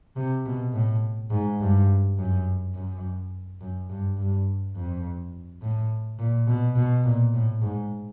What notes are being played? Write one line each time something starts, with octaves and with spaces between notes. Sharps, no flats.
C3
B2
A2
G#2
G2
F#2
F#2
F#2
G2
G2
F2
A2
A#2
B2
B2
A#2
A2
G#2